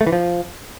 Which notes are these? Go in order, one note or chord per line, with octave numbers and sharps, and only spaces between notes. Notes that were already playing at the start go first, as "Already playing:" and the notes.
A3
E3
F3